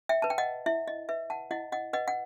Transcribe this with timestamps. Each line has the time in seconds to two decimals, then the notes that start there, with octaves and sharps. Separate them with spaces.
0.09 E5 G5
0.22 B4 A5
0.30 G5
0.38 D#5 F#5
0.66 E4 E5
0.88 D#5
1.09 B4 E5
1.30 F#5 A5
1.51 E4 D#5 F#5
1.72 D#5 F#5
1.93 B4 D#5 F#5
2.08 F#5